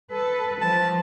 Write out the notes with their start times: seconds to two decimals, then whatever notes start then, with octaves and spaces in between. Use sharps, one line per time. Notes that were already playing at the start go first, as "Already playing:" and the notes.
0.11 A4 B4
0.61 F3 A5